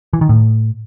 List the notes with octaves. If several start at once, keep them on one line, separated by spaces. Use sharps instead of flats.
E3
D#3
A2